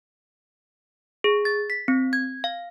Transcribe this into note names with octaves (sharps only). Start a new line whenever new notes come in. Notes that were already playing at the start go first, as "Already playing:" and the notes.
G#4
A6
B6
C4
G#6
F5